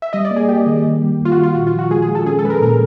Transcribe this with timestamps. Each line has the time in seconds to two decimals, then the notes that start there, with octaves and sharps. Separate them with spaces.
0.02 E5
0.13 G3 D#5
0.25 D5
0.31 A#3
0.36 G#4
0.49 A#3 G4
0.66 D#3
0.84 D#3
1.02 G3
1.20 F#2
1.25 F4
1.32 F#4
1.38 D#3
1.43 F4
1.55 A#2 F#4
1.67 F4
1.73 F3
1.79 F#4
1.91 G#3 G#4
2.02 G#4
2.08 G#3
2.15 A4
2.26 C#4 G#4
2.39 A4
2.44 G#3 B4
2.50 A#4
2.62 A#2 A#4